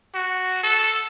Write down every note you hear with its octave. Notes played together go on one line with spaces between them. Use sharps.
F#4
A4